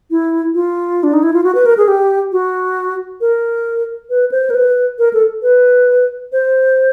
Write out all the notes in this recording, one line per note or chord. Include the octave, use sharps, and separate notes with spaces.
E4
F4
D4
D#4
E4
F4
F#4
B4
A#4
G#4
G4
F#4
A#4
B4
C5
A#4
B4
A#4
A4
B4
C5